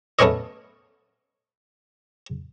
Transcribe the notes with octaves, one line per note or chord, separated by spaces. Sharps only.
A3 B3 C#4 C#5 D#5